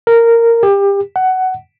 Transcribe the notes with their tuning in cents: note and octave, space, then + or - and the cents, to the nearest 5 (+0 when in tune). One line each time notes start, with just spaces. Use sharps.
A#4 -10
G4 +25
F#5 +15